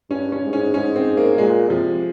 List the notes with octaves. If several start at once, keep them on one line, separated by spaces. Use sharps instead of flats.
G2 C#4
C#4
G#2
C#4
G#2 C#4
C4
A#3
A#2 G#3
C3 F3